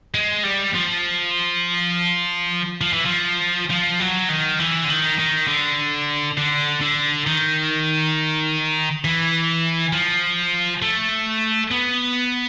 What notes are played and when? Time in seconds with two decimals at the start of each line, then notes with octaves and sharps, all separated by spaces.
0.14 G#3
0.43 G3
0.74 F3
2.81 F3
2.93 E3
3.06 F3
3.70 F3
4.00 F#3
4.29 D#3
4.59 E3
4.84 D3
4.89 D#3
5.19 D#3
5.48 D3
6.37 D3
6.81 D3
7.26 D#3
9.05 E3
9.93 F3
10.82 A3
11.71 B3